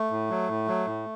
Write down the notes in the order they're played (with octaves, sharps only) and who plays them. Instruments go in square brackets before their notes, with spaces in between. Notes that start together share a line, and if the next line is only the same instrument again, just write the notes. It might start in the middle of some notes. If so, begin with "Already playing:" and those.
Already playing: [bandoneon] A3
A2
F#3
A2
F#3
A2